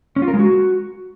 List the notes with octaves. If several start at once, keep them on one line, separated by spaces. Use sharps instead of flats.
C#4
F4
A#4
G#3
F#4